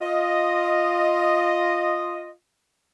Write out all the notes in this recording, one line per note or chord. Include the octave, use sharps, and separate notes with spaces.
F4 D#5